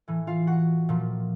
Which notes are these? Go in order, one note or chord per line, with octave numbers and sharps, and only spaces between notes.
A2 E3
F4 F5
F#4 F#5
A#2 F3